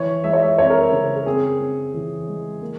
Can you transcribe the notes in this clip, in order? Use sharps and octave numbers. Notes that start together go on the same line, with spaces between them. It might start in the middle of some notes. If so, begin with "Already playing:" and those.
Already playing: E3 C#5
G#3 E5
C#5
E5
C4 C#5
A#4
C5
C#3
A#4
C4 G#4
C4
E3
G#3
A#3